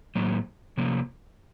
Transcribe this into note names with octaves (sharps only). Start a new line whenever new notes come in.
A2 F#3 A#3
C3 F3 A#3